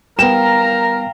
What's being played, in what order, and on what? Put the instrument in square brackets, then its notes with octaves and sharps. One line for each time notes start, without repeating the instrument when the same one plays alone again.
[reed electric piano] G3 B3 [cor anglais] A#4 [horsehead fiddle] F5 A#5 [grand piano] G5 E7